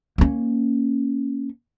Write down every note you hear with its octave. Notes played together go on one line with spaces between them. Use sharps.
A#3 C#4